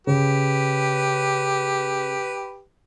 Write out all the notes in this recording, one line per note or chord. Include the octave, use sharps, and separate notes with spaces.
C#3 G4 B4